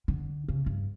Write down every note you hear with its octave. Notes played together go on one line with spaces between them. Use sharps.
D3
C#3
G2